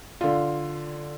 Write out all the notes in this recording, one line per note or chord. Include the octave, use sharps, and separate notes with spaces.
D3 F4